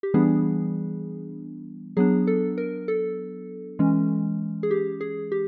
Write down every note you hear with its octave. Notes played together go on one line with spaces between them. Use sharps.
G4
E3 G3 B3 D4 G#4
F#3 B3 D4 G#4
A4
A#4
A4
E3 G#3 C#4
G#4
G4
G#4
G4